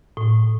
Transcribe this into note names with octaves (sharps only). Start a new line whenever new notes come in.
A2